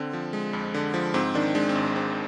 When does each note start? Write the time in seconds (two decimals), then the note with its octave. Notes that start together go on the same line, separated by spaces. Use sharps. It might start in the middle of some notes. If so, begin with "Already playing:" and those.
Already playing: D3 C4
0.13 F3
0.33 G#3
0.53 F2
0.74 D3
0.94 F3
1.14 G#2 C4
1.35 D#3 D4
1.55 G#3 D4
1.69 C4
1.75 G#1
1.96 G#2 C4